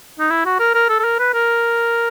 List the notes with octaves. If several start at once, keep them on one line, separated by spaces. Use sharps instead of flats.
D#4
E4
F#4
A#4
A#4
A4
A4
A#4
B4
A#4